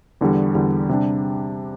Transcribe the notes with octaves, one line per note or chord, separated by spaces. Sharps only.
E2 D3 G3
E2 D3 G3
C3 G3 D4